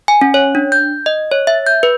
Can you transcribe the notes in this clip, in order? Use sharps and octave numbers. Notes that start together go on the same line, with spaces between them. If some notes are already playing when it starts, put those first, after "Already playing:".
G#5
C#4
C#5
D4
G6
D#5
C#5
E5
G6
B4